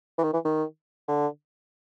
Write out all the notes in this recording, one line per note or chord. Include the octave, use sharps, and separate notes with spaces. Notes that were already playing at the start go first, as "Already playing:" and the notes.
E3
D#3
E3
D#3
D3